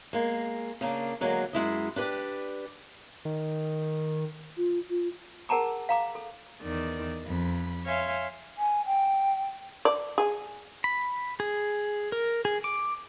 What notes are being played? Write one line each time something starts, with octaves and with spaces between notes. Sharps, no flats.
G#3 A#3
C#3 A#3 D4
D3 F#3 G#3 A#3
F#2 G#3 E4 D#5
D4 G4 B4 D5
D#3
F4
F4
G#4 A#4 F#5 A5 A#5 D6
F5 A#5 D6
A4
E2 D#3 D5
F2 B5
C#5 E5 F5 G#5 C6
G#5
G5
D5
G#4
B5
G#4
A#4
G#4
D6